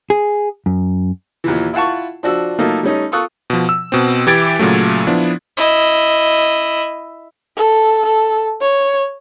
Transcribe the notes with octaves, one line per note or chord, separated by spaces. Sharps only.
G#4
F#2
D#2 A#2 E3
E4 F4 F#5 A5 C#6
F3 D4 F#4 E6
F#3 A3 A#3 D#4 F4 A4
G3 A3 C#4 D#4
F4 A4 C#6 D#6 F#6
B2 F3
E6
B2 C4
E3 E4 G4 G#6 A6 D7
A#2 C#3 F#3 A3
F3 B3 D4 E4
E4 D#5
A4
A4
C#5